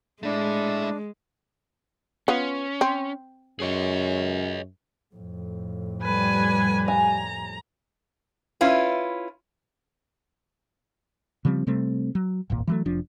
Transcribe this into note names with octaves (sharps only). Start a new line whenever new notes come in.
G#3 A3 D4 E4
B3 C#4 F4
C4
F#2 G#4 C#5 D#5
F2 A2
G3 B4 G#5
G#5 A#5
C#4 E4 F4 B4
C#3 F3 G3 C4
C3 G3 A3 C4
F#3
D#1 G#1 A#2
E3 F#3 A3
F1 F3 D4